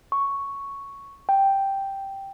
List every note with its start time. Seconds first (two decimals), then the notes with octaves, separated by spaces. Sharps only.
0.12 C#6
1.29 G5